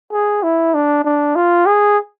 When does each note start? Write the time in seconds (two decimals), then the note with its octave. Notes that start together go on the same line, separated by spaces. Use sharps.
0.13 G#4
0.43 E4
0.75 D4
1.05 D4
1.36 F4
1.66 G#4